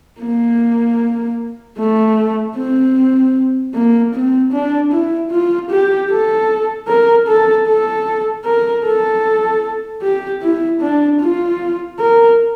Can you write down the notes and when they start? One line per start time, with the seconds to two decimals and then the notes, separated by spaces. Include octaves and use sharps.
0.21 A#3
1.79 A3
2.57 C4
3.75 A#3
4.14 C4
4.53 D4
4.92 E4
5.31 F4
5.70 G4
6.10 A4
6.88 A#4
7.28 A4
7.68 A4
8.45 A#4
8.86 A4
10.02 G4
10.42 E4
10.81 D4
11.21 F4
11.99 A#4